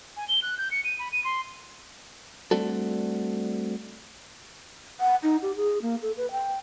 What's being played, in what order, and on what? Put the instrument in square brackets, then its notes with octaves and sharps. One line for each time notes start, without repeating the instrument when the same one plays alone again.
[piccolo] G#5
G7
F#6
G6
C#7
D#7
B5
D#7
C6
[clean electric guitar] G3 A3 C4 D4 F#4 A4
[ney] F#5
D#4
G4
G#4
A#3
A4
B4
G5